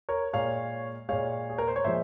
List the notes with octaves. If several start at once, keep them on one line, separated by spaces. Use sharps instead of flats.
A#4 C#5
A#2 G#3 C#5 F5
A#2 G#3 C#5 F5
G#4
A#4
C5
C#5
A#2 F3 G#3 C5 E5